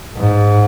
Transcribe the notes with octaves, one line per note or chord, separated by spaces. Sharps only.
G#2